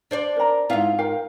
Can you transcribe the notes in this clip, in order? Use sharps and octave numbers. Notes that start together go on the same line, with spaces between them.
D4 C5 D5
A#4 A#5
G#2 E4 F4 E5 F5
A#4 F5 G5